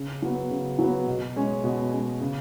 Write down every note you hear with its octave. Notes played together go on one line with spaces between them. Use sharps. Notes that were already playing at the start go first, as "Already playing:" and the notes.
Already playing: C#3
F#3 B3
C#3
F#3 B3
B2
G#3 C#4
B2
G#3 C#4
C#3